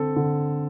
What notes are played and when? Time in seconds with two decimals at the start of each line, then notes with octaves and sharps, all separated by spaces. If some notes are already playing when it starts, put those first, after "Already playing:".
Already playing: D3 C4 A4
0.16 D3